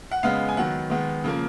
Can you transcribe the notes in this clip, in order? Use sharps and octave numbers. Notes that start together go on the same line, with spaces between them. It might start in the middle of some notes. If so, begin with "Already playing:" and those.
F#5
C#3 G#3 B3 F5
G#5
D#3 F#3 B3 F#5
D#3 G#3 B3
C#3 F3 A#3